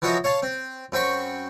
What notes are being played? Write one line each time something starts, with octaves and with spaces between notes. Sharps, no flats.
E3 F3 F#4 C#5 D#5 E5
C#5 F5 A5
C4
F#2 C4 B5 C#6